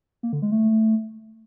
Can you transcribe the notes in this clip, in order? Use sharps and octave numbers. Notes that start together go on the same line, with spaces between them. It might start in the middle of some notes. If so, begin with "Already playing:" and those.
A#3
D3
G#3
A3